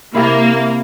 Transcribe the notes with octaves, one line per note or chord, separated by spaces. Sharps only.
C3 A#3 E4